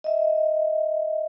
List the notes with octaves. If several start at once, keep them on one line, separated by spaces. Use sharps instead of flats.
D#5 E5